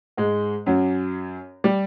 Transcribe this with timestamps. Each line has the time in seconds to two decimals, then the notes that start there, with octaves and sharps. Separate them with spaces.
0.17 G#2 G#3
0.66 F#2 F#3
1.64 G3